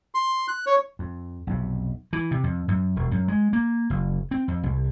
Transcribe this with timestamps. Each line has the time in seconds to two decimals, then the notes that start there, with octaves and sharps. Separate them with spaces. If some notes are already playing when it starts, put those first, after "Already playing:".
0.15 C6
0.48 F#6
0.66 C#5
0.99 F2
1.47 B1 F2 C3
2.13 E3
2.31 C3
2.44 F2
2.68 F#2
2.96 E1
3.11 F#2
3.28 G#3
3.53 A#3
3.90 F#1
4.31 C4
4.48 F2
4.63 C2